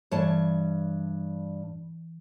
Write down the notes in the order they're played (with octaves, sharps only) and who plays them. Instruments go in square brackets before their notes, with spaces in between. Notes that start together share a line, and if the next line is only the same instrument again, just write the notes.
[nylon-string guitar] G2 C#5 A5 [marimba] E3